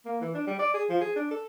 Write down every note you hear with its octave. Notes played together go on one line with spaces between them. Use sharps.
A#3
E3
D4
G3
D5
G#4
F3
G#4
D4
A4